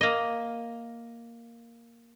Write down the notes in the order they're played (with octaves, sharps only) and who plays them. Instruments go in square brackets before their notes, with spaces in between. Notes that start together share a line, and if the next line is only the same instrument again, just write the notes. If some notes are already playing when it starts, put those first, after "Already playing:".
[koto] A#3 D#5